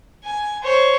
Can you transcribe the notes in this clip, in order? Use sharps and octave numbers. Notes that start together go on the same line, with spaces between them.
G#5
C5 C#5